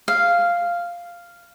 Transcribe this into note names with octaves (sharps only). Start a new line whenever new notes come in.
F5